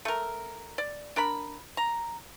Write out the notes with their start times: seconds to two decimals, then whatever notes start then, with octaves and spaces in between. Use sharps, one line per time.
0.05 A3 A#4
0.78 D5
1.16 D4 A#4 B5
1.77 A#5